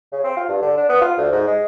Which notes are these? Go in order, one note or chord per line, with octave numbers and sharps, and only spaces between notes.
C#3
C4
F4
G2
D3
D4
B3
F4
D2
G#2
G#3